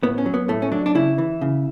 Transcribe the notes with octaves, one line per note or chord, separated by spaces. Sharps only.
A2 B3
C#4
F#3
B3
A2 A3
C#4
F#3 D4
D4
C#3 E4
E3
C#3